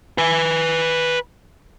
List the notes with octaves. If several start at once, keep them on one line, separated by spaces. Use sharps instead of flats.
B4 G#5